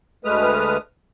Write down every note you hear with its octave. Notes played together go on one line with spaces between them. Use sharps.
D2 G#3 A3 B4 D#6 F6